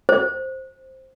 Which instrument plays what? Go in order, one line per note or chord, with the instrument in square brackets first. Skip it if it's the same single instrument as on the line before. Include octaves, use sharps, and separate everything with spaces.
[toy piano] C5